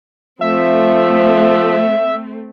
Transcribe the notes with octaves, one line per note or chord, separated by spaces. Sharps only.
F3 A3 C4 E5